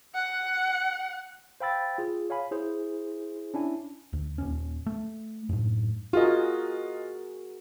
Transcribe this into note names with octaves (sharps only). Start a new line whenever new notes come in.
F#5
C5 F5 G5 B5 E6 A6
F4 G#4
C#5 F5 G#5 B5
E4 G#4 C5
C#4 D4 E4 G#5
D2
D#1 C#4
A3
F#2 A2
F4 F#4 G#4 A#4 D#5